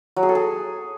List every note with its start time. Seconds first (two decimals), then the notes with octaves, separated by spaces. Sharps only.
0.17 F#3
0.23 G#4
0.29 A4
0.35 G#4